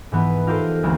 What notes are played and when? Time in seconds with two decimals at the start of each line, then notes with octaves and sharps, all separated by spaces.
0.12 G#2 E3 B3
0.47 D#4 F4 G4 A4 A#4 C5
0.83 D2 E3 G#3 A#3